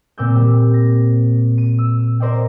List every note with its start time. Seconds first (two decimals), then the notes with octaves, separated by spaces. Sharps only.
0.18 A#2 C4 D6 E6 G6
0.36 G3
0.74 A#6
1.58 D#7
1.78 E6
2.20 A#4 C5 D5 D#5 G5